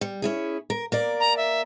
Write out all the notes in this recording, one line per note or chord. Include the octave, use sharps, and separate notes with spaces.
G3
C#4 E4 G#4
A#4
A#3 A#4 D5
A#5
E5